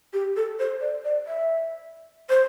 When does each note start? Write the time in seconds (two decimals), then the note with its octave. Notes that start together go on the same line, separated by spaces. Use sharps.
0.13 G4
0.36 A4
0.59 C5
0.81 D5
1.04 D5
1.27 E5
2.29 C5